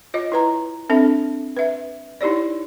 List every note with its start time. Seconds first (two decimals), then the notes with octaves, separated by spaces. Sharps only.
0.14 F4 C#5 D#5
0.32 E4 B4 A#5
0.90 C4 D4 A4 E5
1.57 B4 E5
2.21 D#4 E4 G4 C#5 D5